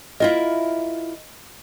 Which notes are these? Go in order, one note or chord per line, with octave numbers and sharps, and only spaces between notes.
E4 F4 A#4 D#5